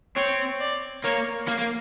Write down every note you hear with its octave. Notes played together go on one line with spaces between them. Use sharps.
C4 C#5
D5
A#3 C#5
A#3
A#3